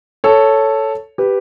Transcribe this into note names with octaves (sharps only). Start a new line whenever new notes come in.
A4 C#5
G4 B4